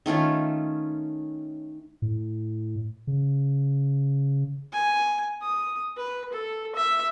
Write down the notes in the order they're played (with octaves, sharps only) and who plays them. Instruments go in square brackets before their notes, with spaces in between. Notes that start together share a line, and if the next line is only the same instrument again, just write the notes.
[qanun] D#3 A3 C#4 F4
[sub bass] A2
C#3
[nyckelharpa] G#5
D#6
B4
A4
E5